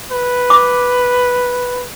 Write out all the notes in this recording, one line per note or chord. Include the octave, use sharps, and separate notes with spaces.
B4
D6